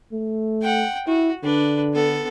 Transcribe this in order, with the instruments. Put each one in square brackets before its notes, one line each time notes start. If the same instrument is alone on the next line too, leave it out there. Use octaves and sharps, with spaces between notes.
[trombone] A3
[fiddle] F#5 G5
[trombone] E4 [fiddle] F#4
[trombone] D3 [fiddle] D4 B4
[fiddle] B3 A4